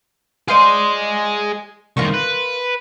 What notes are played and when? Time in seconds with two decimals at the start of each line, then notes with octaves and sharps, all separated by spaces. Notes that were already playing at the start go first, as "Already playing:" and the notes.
0.48 F4 G#4 C5 D5 D#5
1.97 C2 D#3 F4 A#4 C#6
2.14 B4